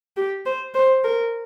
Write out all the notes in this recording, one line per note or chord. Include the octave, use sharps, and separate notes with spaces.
G4
C5
C5
A#4